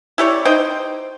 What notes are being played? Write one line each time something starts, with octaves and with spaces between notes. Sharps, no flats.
E4 G4 C#5 D5
D#4 C5 G5